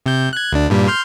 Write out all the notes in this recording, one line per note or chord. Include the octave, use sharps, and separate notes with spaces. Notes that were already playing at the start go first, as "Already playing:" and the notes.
C3 G6
F#6 G#6
D2 D4
G2 A#2 G3
C6 F6 G6